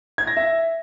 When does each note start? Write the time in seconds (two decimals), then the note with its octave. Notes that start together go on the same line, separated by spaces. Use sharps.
0.18 G#6
0.27 A#6
0.37 E5